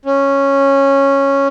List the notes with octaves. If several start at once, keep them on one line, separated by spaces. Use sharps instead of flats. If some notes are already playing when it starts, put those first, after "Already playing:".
C#4